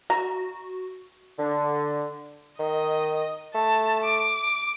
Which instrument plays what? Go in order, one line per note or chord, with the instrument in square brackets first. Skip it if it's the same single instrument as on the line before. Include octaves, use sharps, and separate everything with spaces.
[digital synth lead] F#4 [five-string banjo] A#5
[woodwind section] D3
[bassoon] D#3 [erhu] D#5
[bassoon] A3 [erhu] A5
[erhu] D6